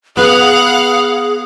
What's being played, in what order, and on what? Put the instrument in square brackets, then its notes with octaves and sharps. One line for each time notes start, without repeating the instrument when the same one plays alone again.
[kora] B3 B4 [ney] G#4 [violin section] F5 F#5 F#6